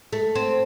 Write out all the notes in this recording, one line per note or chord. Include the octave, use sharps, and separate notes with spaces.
A3
C4